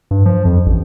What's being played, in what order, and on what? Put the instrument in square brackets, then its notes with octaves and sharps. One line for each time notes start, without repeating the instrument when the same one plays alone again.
[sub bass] G2
F3
F2
A1